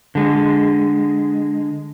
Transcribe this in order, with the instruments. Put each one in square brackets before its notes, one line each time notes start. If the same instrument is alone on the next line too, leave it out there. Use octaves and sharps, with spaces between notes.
[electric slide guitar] D3 G#3